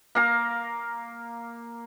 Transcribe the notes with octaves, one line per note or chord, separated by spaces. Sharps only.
A#3 F5 A#5